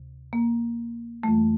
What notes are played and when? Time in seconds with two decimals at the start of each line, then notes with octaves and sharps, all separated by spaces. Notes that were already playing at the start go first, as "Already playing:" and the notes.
Already playing: D2 C3
0.33 A#3
1.23 F2 E3 G3 A3